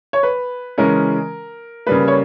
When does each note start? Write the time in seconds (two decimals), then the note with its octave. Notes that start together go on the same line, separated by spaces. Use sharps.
0.13 C#5
0.23 B4
0.78 C#3 E3 G#3 C#4 A#4
1.86 C#3 G3 A#3 B4
2.08 C#5